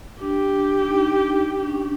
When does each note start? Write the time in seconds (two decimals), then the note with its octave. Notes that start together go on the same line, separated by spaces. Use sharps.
0.21 D4 G4
0.83 D#4
1.59 D4
1.68 C#4
1.75 D4